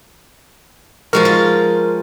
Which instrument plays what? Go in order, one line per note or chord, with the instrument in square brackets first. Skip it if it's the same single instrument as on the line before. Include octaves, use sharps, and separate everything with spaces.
[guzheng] F3 G#3 F#4 [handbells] A#4
[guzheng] F4